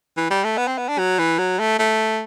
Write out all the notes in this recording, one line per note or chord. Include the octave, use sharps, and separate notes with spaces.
E3
G3
A3
B3
C4
B3
D4
F#3
E3
F#3
A3
A3